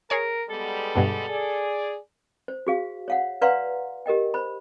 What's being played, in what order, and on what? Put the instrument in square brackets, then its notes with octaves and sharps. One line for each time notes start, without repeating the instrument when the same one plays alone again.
[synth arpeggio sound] G#4 C#5 G#5 [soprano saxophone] A#4
[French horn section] G3 G#3 B3 [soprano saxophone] A4
[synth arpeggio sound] G2 B2 D3
[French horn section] G#4 D5
[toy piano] C5
F#4 G#4 F5
C#5 F5 F#5
B4 D5 F5 F#5 A#5 C6
G4 A#4 D#5 G5
C5 B5